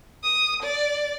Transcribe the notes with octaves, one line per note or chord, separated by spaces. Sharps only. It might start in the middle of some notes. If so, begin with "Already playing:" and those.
D#6
D5